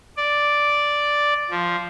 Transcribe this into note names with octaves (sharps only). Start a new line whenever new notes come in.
D5
F3